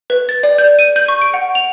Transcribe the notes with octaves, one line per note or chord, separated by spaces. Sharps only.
B4
A6
D5
G6
D#7
G6
C#6
D7
F#5
F7